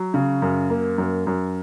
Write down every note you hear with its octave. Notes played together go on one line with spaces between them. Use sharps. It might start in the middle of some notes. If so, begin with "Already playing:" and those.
Already playing: F#3
C#3
F#2
A#3
F#2
F#2